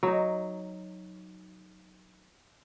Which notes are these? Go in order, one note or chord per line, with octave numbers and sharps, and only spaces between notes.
F#3 D#4